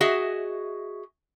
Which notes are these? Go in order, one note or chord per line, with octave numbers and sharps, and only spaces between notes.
F#4 G#4 D#5 E5